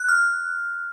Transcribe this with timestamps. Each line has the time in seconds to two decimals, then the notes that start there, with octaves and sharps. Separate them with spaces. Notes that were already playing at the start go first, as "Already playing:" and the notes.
Already playing: F#6
0.09 F6